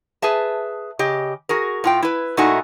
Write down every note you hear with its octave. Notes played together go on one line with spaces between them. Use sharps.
G#4 B4 E5 A5
C#3 G4 D#5
F#4 G#4 A#4
A2 F4 G5
E4 B4
A#2 A3 D#4 E4 F#4 G#5